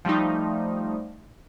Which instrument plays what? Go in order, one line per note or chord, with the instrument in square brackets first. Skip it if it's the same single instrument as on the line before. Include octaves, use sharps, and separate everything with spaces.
[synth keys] F3 G3 A3 D#4